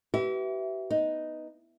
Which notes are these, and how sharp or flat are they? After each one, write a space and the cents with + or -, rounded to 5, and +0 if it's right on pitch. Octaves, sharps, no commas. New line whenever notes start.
G4 -45 B4 +5 E5 +0
B3 +0 D#4 +0